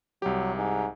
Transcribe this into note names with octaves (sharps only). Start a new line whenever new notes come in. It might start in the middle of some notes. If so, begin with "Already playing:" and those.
C2 F#3 G4
G#2